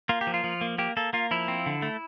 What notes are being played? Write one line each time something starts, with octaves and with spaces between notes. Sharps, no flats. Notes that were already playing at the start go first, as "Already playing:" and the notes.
A#3 F4
G4
F3
F4
F3
A#3
A#3 G4
A#3 A4
A#3 F4
F3 E4
C4
D3
A3